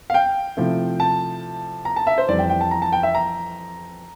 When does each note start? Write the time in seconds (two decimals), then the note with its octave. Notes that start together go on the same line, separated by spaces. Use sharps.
0.10 F5
0.14 G5
0.57 C3 F3 A3 E4
1.00 A5
1.85 A#5
1.96 A5
2.07 E5
2.18 C5
2.29 F2 E3 G3 D5
2.39 G5
2.50 G5
2.61 A5
2.71 A#5
2.82 A5
2.93 G5
3.03 E5
3.15 A#5